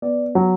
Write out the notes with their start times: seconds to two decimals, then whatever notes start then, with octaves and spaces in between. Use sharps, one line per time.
0.02 B3 D5
0.35 F#3